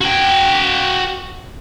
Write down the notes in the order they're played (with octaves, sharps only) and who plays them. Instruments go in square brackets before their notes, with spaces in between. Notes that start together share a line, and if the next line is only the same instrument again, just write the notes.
[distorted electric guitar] F#4 G5